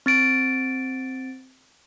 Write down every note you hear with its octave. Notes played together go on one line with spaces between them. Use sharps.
C4 A6 D7